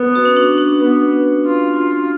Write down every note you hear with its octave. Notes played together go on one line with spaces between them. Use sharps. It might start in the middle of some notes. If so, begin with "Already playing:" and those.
Already playing: B3
F#4
C#4
D4
D4
B3
F4
F4